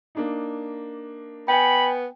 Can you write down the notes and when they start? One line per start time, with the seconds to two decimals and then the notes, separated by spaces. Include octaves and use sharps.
0.15 A#3 D4 D#4
1.48 B3 G5 G#5 B5